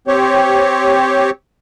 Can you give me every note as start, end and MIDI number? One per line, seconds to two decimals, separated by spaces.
0.07 1.30 60
0.07 1.30 67
0.07 1.30 73